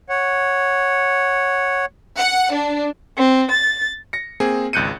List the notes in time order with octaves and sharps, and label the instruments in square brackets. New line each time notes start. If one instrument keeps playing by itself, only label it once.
[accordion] C#5 F#5
[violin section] F#5
D4
[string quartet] C4
A6
[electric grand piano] A#6 C#7
A#3 C4 G#4
G#1 C#2 F#6 G6 C#7 D#7